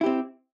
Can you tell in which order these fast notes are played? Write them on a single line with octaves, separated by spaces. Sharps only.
E4 G4 C4